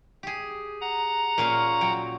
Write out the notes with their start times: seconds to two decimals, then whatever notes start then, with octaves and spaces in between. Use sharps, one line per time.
0.23 G4 G#4
0.81 F#5 A#5
1.38 A#2 C#4 F5
1.81 F#3 G5